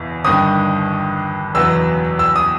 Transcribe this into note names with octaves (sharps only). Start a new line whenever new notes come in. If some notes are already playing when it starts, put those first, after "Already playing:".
Already playing: F#1 E2 B2
G1 G2 D#3 D#6
F#1 E2 B2 F#3 B3 E6
E6
D#6